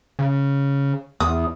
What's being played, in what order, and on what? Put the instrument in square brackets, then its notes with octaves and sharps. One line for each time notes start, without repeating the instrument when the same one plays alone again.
[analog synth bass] C#3
[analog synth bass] E2 [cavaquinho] D#6